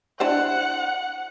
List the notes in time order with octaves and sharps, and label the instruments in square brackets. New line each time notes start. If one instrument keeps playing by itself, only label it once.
[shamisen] D4 E4 C5 [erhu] F#5